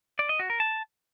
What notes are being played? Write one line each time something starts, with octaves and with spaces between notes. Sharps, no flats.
D5
D#5
F#4
A#4
A5